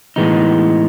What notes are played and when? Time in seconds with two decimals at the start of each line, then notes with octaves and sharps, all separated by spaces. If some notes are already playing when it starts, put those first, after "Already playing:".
0.16 A2 E3 G#3 B3 D#4